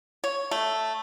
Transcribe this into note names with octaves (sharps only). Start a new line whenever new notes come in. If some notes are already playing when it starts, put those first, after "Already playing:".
C#5
A3